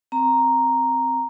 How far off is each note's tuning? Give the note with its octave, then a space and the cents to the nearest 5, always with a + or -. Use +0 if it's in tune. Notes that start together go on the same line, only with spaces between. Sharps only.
C4 +0 A#5 +0